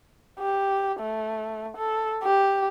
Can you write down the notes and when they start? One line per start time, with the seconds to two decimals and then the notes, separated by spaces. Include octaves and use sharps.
0.39 G4
1.00 A3
1.77 A4
2.23 G4